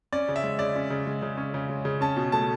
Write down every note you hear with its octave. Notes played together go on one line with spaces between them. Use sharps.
C#4 D5
C#3
E5
G#3
C#3 D5
C#4
C#3
G#3
C#3
C#4
C#3
G#3
C#3
C#4 A5
B2
A3 A5